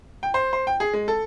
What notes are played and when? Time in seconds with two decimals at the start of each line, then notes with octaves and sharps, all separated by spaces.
0.23 G5
0.34 C5
0.53 C5
0.67 G5
0.80 G#4
0.93 G#3
1.08 A4